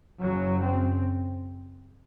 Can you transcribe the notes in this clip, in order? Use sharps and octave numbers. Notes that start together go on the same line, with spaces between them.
F#1 F#2 C#3 F#3
C4